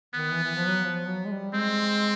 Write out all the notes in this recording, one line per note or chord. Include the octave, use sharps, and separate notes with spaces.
D#3 B3
E3
E3
F3
F#3
F3
F#3
G#3
G3
G#3 C4